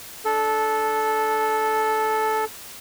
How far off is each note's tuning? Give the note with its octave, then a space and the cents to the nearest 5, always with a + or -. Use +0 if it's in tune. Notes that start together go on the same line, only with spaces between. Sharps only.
D4 +0 A4 -10